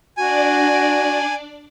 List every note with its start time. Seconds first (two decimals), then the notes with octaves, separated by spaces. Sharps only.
0.17 D4 F#4 D5 G#5